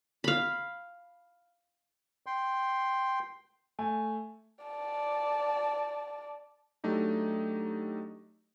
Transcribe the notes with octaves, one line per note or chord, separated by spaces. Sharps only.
F5 B5
G5 C6
A3 G#5
D5 A5
F#3 A3 D4 D#4 G4